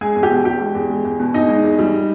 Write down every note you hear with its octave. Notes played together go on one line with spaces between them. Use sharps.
G#3 G#4 G#5
E2
G4 G5
B2
E2 G4 G5
G#3
E2
G#3
E2
B2
E2 D#4 D#5
G#3
E2
G3